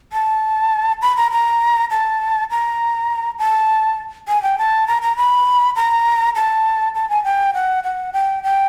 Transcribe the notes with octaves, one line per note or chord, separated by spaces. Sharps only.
A5
B5
A#5
A#5
A5
A#5
A5
G#5
G5
A5
A#5
A#5
B5
A#5
A5
A5
G#5
G5
F#5
F#5
G5
G5